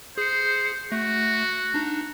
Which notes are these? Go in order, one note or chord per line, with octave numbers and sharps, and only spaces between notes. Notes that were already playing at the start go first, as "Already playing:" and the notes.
G#4 C5 C#7
A3 F#4
D4 D#4